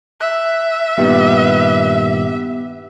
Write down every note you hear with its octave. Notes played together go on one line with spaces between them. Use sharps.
E5 F#6
G2 A#2 D#3 B3 G4 B4